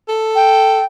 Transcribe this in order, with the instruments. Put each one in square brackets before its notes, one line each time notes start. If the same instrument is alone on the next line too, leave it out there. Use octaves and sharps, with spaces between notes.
[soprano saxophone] A4
[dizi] G5